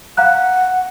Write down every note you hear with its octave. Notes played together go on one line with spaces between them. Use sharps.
F5 F#5 A#5 F#6